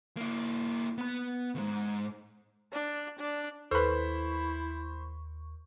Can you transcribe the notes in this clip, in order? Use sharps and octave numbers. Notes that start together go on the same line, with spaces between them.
A#3 E4
B3 B5
D2 G#2
D4
D4
D#2 E4 A4 B4 C5 B5 C#6